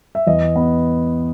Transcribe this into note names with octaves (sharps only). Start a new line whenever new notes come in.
E5
E2 D#5
B3